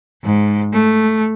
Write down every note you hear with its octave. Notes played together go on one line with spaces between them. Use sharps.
G#2
A3